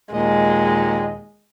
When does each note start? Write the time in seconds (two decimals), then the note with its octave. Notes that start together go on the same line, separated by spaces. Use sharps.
0.13 D#2 A#2 G#3 D#5